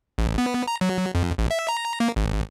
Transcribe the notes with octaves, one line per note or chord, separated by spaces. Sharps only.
A1
B3
A#5
F#3
F2
A1
E5
A#5
A#3
G#1